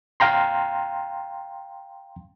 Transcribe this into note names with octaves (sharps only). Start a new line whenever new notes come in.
F5 G5 A#5 C6